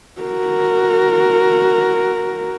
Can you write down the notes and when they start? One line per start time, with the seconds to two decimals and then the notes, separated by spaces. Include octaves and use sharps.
0.21 F#4 A#4